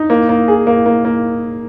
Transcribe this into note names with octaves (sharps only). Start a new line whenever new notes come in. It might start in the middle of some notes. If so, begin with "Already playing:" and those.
Already playing: D#4
A#3
A#3
G#4
A#3
A#3
A#3